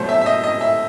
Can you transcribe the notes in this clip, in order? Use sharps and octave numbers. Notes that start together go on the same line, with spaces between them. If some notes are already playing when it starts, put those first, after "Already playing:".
Already playing: B2 F#3 A3 C5
E5
E5
D#5
D#5
E5